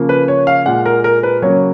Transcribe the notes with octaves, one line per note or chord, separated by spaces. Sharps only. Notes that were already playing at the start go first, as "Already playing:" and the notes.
Already playing: C#3 F3 A#3
B4
C#5
F5
A#2 G#3 F#5
A#4
A#4
B4
C#3 F#3 A#3 C#5